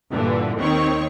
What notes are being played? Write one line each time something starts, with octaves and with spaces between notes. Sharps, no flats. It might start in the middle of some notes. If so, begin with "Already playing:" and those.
G2 A#2 D3 E3
D#2 D#3 C4 C#5 C#6